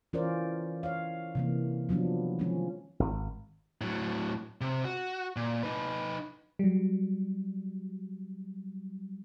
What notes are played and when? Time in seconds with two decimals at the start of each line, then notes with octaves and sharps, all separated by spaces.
0.13 E3 C#4 F4 A#4 C5 D5
0.83 C#5 F5
1.35 C3 E3 A#3
1.89 F3 F#3 B3 D4
2.39 D#3 F3 G#3 C#4
3.00 G#1
3.81 A2 F#3
4.61 C3
4.85 F#4
5.36 A#2
5.63 D#4 B4
6.59 F#3 G3